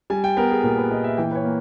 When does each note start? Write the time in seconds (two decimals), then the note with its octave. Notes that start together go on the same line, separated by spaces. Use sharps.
0.10 G3 G#5
0.24 G5
0.37 B3 A#4
0.51 G#4
0.63 A#2 A#4
0.77 B4
0.91 A#2 D#5
1.04 E5
1.17 E3 G5
1.31 B4
1.35 C#5
1.44 A#3